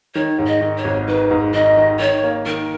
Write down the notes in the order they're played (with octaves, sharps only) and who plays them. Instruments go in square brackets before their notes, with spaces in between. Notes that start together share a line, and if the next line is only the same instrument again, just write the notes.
[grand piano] D#3 [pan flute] C#5
[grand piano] G#2
[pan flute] D#5
[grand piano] D#3
[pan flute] C#5
[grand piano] G#1
[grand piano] D#3 [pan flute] B4
[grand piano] G#2
[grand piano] D#3 [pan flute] D#5
[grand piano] D#3
[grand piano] D#3 [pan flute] C#5
[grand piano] A#3
[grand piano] D#3 [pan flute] A#4